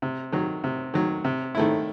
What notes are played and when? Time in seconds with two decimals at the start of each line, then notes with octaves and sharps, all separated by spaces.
0.02 C3
0.32 D#3 F#3
0.64 C3
0.94 D#3 F#3
1.25 C3
1.55 D#3 A3 E4